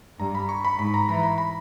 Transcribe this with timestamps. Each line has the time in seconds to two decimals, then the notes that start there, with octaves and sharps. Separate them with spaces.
0.19 G2 A#5
0.35 B5
0.49 C#6
0.65 B5
0.79 G#2 B5
0.94 A#5
1.08 E3 B5
1.23 B5
1.38 B5